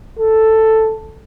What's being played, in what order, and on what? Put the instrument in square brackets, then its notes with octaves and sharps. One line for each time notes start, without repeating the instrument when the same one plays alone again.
[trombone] A4